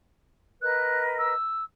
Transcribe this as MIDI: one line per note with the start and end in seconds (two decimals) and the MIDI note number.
0.62 1.35 70
0.62 1.35 71
0.62 1.35 75
0.62 1.03 90
1.18 1.64 88